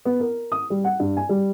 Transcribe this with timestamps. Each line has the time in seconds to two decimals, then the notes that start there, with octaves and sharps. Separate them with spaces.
0.05 B3
0.20 A#4
0.52 D#6
0.70 G3
0.84 F#5
1.00 G2
1.17 G#5
1.29 G3